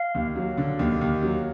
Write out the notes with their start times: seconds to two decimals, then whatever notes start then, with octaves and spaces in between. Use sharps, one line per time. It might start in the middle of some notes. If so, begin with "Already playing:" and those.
Already playing: F5
0.15 D#2
0.36 F#3
0.57 D3
0.79 D#2
1.01 D#2
1.23 F#3